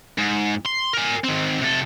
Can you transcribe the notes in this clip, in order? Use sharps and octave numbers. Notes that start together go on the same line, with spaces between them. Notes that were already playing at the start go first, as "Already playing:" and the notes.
G#2
C6
A#4 G#5
D#3 C4
C3 A4